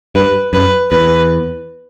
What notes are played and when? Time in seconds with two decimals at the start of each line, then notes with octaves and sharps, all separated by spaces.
0.15 G2 B4
0.53 F#2 B4
0.91 E2 B4